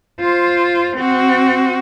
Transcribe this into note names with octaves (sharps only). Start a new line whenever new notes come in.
F4 C5
C4 F#4